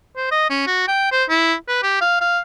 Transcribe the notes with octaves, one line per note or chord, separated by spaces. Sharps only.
C5
D#5
C#4
F#4
G5
C5
E4
B4
G4
F5
F5